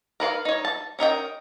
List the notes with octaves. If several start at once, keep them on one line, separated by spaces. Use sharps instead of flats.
A#4 B4 C#5 F5
D#4 C#5
A5
C#4 A#4 D#5 G5